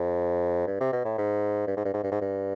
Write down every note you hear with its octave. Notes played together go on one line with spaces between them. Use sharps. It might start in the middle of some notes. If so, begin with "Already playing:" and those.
Already playing: F2
G2
C3
B2
A2
G#2
G2
G#2
G2
G#2
G2
G#2
G2